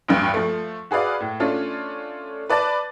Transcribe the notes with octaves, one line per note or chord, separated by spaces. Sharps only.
A1 D2 G2
F3 A3
F#4 G#4 B4 D5 F5
A2
A3 C#4 D4 F4
B4 D5 A5 A6